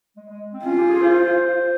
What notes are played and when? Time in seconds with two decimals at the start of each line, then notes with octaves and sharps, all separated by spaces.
0.16 G#3
0.29 G#3
0.53 C4
0.65 C#4 F4
0.77 G4
0.89 G#4
1.01 C5